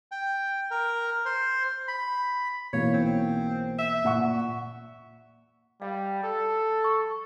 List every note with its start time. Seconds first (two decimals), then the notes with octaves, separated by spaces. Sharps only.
0.12 G5
0.71 A#4
1.26 C5
1.88 B5
2.73 B1 E3 A#3 C#5
2.94 C4
3.78 E5
4.05 A#2 F#5 C#6
5.82 G3 F5
6.24 A4
6.84 C#6